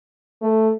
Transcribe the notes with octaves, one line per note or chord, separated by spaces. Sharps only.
A3